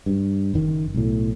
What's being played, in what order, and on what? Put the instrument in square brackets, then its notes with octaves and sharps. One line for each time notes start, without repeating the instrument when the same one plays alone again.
[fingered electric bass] G2
F#1 D#3
B1 A2